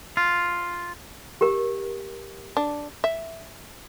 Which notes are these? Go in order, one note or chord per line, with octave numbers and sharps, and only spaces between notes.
F4
G4 A#4
D4
E5